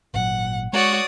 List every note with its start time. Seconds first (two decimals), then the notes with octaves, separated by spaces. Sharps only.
0.14 G#1 A#2 F#3 F#5
0.73 G#3 F#4 C#5 D5 D#6